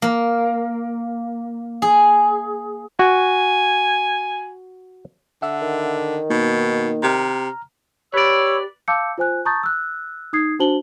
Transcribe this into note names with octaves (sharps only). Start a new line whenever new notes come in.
A#3
G#4
F#4 G#5
D3 E5 F#5 E6
D#3
B2 A#3 D#4
C3 A#5 F6
G4 B4 C#5 D5 B5 E6
F5 A5 D6 E6 G6 C#7
F4 C5 G#5 F#6
A5 A#5 C#6 D#6 G6 A6
E6 F#6
D#4 D#6 G#6 C7
D4 F#4 C5 A5 F#7 G7